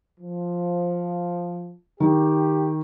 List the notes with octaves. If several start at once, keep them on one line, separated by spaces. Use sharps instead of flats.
F3
D#3 G4